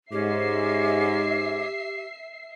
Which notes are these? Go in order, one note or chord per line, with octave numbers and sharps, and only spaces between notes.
G#2 C#4 G4 D#5 E5 D6 C7